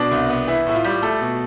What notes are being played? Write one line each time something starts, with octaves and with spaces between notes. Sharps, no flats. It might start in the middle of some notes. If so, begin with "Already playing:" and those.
Already playing: B2 D4
C2
B3
E3 E4
A2 E4
F4
G3
A3 A4
B2